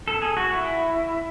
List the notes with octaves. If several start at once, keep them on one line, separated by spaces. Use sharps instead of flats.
A4
G#4
F#4
E4